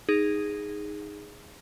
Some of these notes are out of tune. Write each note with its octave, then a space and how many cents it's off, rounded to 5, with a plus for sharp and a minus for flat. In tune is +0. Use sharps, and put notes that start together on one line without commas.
D#4 +0 G#4 -10